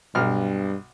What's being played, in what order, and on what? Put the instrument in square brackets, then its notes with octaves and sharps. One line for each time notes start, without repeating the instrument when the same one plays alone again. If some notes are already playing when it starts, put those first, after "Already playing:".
[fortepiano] B1 F6 [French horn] G2